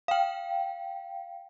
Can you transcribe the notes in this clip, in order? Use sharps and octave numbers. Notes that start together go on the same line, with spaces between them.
F5 G5